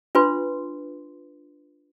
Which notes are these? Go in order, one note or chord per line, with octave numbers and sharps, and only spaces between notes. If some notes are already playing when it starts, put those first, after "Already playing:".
D4 F4 B4 C6